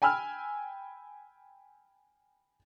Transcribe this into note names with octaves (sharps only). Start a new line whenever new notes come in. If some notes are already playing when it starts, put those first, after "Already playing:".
G5 G#5 B5 E6 F6